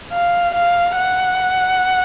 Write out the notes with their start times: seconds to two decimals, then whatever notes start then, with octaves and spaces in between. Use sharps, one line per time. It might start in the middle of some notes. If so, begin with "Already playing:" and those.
0.13 F5
0.55 F5
0.97 F#5